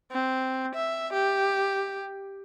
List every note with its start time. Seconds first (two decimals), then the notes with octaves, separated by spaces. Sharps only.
0.11 C4
0.75 E5
1.13 G4